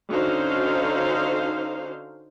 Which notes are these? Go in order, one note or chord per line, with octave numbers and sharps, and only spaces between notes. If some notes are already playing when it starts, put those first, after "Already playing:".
D3 C#4 D#4 F#4 C5 F5